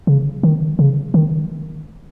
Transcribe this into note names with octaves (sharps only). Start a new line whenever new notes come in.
C#3
D#3
C#3
D#3